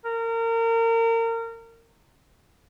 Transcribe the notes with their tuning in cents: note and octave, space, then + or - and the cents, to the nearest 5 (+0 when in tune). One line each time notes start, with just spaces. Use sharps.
A#4 -30